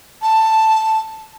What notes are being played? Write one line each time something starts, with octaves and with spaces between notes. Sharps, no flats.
A5